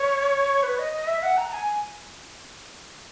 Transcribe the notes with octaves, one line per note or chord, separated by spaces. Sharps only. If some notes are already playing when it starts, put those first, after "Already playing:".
Already playing: C#5
B4
D#5
D#5
E5
F#5
A#5
A#5
G#5